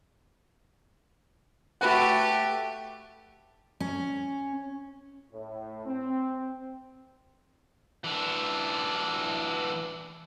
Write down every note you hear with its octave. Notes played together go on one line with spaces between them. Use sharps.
A3 F#4 G4 B4 F#5
C#4
A2
C4
E3 D4